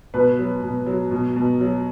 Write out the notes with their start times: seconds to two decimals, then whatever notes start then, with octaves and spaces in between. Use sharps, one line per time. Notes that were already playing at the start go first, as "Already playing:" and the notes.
0.14 B2 B4
0.38 F#3
0.63 B2
0.86 F#3
1.11 B2
1.36 B2
1.61 F#3